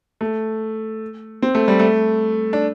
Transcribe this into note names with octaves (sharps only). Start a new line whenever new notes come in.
A3
C4
A3
G3
A3
D4